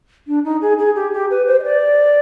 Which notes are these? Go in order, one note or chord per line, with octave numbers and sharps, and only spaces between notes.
D4
D#4
G#4
G#4
G4
G4
B4
C5
D#5
D5